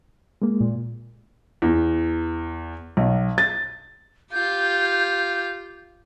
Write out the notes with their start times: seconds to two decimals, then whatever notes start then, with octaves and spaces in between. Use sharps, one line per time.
0.42 G#3 A#3
0.61 A#2
1.62 E2
2.97 B1
3.38 A6
4.32 F4 G4 G6